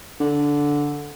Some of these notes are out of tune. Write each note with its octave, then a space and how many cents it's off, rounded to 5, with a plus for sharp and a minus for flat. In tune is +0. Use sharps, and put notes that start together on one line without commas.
D3 -10